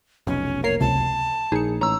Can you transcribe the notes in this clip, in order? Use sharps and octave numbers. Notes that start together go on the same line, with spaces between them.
F1 B1 C#4
A#3 A#4 C#5 C7
C#2 C3 A5
A#1 D#4 G#4 C#7
A1 C#5 A#5 E6